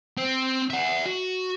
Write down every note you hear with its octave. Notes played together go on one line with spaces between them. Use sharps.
C4
E5 F#5
F#4